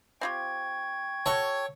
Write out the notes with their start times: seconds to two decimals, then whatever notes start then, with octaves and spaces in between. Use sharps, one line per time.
0.21 C4 F4 G4 G5 C#6 G#6
1.26 F#4 A4 C#5